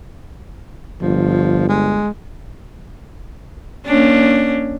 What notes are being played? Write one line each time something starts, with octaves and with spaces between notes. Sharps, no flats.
G1 F3
G#3
A#3 C#4 D4